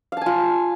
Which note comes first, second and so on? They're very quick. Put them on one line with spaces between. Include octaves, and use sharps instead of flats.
F5 A5 G#5 F4